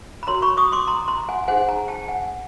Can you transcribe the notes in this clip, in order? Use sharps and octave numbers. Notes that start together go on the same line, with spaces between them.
B5
F#4 A#4 C#5 A#5 C6
B5 C#6
C#6 D#6
C6 D6
A#5 C6
A#5 C6
F#5 G#5
D#4 G#4 C5 F#5 G#5
G#5 A#5
G5 A5
F#5 G#5